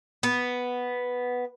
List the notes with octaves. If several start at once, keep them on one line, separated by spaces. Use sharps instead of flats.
B3